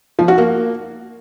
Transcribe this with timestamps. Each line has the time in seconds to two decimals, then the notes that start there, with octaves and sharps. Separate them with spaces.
0.19 F3
0.28 F#4
0.38 A#3